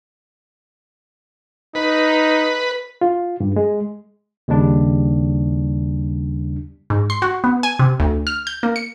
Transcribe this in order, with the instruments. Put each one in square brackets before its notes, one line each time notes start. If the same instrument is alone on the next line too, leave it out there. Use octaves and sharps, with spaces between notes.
[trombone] D#4 [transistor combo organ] B4
[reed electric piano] F4
G2
G#3
[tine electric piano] D#2 C#3 G3 D4
[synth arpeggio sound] G#2
C6
F#4
B3
G#5
C3
D2
F6
G6
A#3
C#7